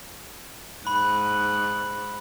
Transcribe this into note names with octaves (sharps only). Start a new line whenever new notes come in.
G#2 B5 F#6